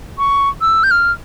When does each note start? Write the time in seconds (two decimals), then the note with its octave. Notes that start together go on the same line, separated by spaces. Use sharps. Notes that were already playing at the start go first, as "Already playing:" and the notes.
0.18 C#6
0.61 E6
0.84 G6
0.91 F6